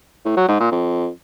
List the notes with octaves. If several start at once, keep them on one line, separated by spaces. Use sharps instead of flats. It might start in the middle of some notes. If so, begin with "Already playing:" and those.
A2
F#3
G#2
A#2
F2